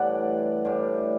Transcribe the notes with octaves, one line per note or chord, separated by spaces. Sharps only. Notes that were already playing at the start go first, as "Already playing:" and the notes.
Already playing: A2 E3 G3 D4 D5 F#5
A2 E3 G3 D4